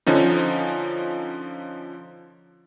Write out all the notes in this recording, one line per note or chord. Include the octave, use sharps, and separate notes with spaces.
D3 F3 C#4 D#4